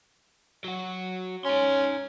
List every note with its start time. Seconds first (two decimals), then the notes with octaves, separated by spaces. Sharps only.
0.65 F#3 F#4
1.45 C#4 D#4 C6